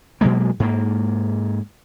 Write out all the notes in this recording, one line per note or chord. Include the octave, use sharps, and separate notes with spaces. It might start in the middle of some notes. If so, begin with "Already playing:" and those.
B2 F#3 G#3 A#3
G#2 A#3